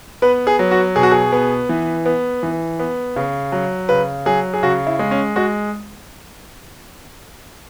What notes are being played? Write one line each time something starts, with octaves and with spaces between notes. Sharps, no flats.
B3 B4
G#4
F#3
F#4
B2 G#4
F#4
G#4
B3
E3
B3
E3
B3
C#3
F#3
C#3 B4
F#3 G#4
G#4
C#3 F#4
E4
G#3
C#4
G#3 F#4